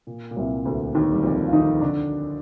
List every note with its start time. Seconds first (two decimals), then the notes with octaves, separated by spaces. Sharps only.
0.07 A#2
0.31 A#2
0.37 C2 C3
0.65 D2 D3
0.95 D#2 D#3
1.12 G3
1.23 F2 F3
1.47 F4
1.52 D#3 D#4
1.81 D3 D4